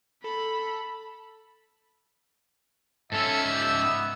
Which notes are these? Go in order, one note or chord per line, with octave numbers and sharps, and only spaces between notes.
A4 B5
G#2 C#4 A4 E5
G4
B3